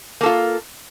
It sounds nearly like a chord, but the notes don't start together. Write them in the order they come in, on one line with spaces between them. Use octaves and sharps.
A#3 A4 F4